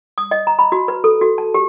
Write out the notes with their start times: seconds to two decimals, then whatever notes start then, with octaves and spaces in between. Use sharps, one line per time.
0.18 D#6
0.31 D#5
0.47 A#5
0.59 B5
0.72 F#4
0.88 B4
1.04 A4
1.21 F#4
1.38 A5
1.54 G4